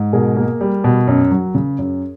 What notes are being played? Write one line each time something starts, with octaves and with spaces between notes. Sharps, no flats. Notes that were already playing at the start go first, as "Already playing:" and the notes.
Already playing: G#2
B2 G#4 A#4
A#3
G3
B2
F#2
F#3
C#3
F#2